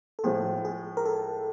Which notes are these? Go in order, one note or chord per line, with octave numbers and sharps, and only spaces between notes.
A4
A2 F3 G#3 G#4
G#4
A#4
A4